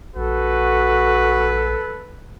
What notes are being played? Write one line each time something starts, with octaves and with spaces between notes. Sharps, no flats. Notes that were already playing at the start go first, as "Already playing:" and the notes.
A#1 F#4 A4 B4